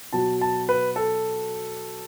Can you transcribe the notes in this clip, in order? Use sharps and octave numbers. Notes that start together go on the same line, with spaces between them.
B2 F#3 A5
A5
B4
A4